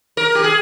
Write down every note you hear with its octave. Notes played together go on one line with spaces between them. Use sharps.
A#4
G4
G#4